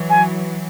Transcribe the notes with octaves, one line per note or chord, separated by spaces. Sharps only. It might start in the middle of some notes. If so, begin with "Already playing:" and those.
Already playing: E3 F#3
G#5